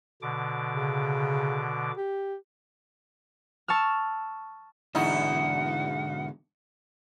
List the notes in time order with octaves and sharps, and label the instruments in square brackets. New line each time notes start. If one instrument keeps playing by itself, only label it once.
[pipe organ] B2 D3 D6
[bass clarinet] C#3
G4
[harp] A5 C#6 E6 F6
[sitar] E2 D#4 E4 [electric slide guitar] G#2 B2 D3 [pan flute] F#5